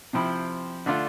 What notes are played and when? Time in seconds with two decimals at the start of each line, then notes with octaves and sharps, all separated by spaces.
0.13 C3 F3 C4 E4
0.86 D3 A3 D4 F4